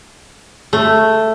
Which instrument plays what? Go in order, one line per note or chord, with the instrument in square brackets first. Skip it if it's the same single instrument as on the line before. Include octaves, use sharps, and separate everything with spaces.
[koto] A3